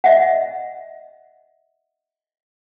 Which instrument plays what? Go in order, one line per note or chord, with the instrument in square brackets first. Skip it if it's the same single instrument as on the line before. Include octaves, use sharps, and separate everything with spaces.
[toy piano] D#5 E5 F#5